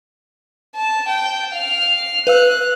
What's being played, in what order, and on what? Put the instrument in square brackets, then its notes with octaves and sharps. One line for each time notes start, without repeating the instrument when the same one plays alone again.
[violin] A5
G5
F5 F6
[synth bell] B4 F5 E6 [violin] F#6